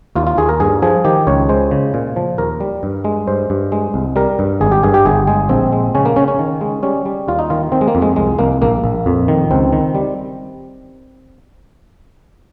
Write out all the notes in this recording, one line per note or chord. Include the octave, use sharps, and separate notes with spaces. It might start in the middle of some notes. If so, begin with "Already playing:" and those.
D#2 F4
F4
D#2 G#4
A#4
G2 G#4
F3 G#4
D#3 G4
C#2 C#5
G#3 C5
C#3
A#2
F3
D#2 A#4
G3
G2
G#3
G2 C5
G2
G#3
C2
G3 A#4
G2
G#1 G#4
G4
G2 G#4
G4
G1 G#4
G#3 G#4
A#1 C4
G#3
C#3 C#4
A#3
C#3 C#4
C#4
D#3
G#3
G3 C#4
G3
D#2 F4
D#4
D#3 F4
D#3 C4
G#3
A#3
F2
G#3
C2 G#3
C2 A#3
A#1 A#3
A#1
F2
D#3
C#2 C4
D#3
G3